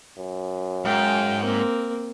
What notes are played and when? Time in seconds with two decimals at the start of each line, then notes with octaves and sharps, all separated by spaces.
0.17 F#2
0.85 G#2 F5 G5
1.43 A#3 C4